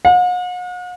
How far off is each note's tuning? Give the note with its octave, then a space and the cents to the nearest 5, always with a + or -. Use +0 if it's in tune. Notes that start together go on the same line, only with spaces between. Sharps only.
F#5 -45